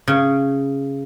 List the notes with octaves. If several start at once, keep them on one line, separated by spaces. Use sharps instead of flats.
C#3